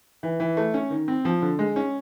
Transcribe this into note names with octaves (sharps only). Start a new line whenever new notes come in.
E3
E3
A3
C#4
D#3
C4
F3
D3
G#3
C#4